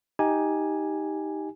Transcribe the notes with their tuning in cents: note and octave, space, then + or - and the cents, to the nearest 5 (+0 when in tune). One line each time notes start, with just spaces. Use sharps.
D#4 +10 G4 +0 G#5 +0